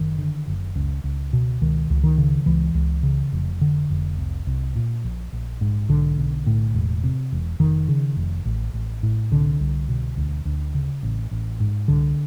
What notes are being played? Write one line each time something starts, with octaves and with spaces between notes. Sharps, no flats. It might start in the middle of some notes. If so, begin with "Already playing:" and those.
Already playing: F#1 D#3
D3
F#1
C#2
C#2
B2
C#2 D#3
C#2
D#3
C#3
C#2 E3
C#2
C#3
F1
D3
F1
C2
C2
A#2
A#1
A#1
G#2
B1 D3
B1
A2
E1
C3
E1
F1 D#3
C#3
F1
A1
A1
A2
C2 D3
C2
B2
D2
D2
C#3
A1
A1
G#2
C2 D3